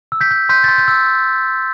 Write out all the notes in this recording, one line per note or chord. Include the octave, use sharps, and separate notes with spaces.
E6
G6 B6
G6
C6 G6 B6
C6 A6
G6
E6